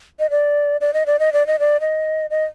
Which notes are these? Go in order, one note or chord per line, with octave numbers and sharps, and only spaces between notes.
D#5
D5
D5
D#5
D5
D#5
D5
D#5
D5
D#5
D#5